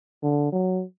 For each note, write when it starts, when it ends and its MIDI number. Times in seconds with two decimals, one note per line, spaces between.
0.23 0.48 50
0.52 0.83 54